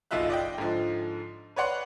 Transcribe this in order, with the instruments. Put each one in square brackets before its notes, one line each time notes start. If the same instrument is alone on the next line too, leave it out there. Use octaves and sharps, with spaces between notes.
[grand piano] F#1 B1 D#4 F4 E5 F#6
D5 D#5 G5
G#2 D3 F3
B4 C#5 D5 F#5 C6